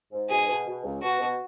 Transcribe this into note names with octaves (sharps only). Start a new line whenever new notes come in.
G#2
B2 G#4
B2
B2
C#2
B2 F#4
B2